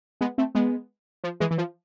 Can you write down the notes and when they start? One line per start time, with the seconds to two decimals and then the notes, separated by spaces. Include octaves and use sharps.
0.21 G#3 B3
0.38 A3 C4
0.55 G#3 B3
1.24 F3
1.40 E3 G#3
1.51 E3
1.58 F3